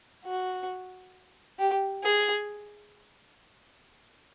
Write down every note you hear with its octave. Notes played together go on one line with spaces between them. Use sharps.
F#4
G4
G#4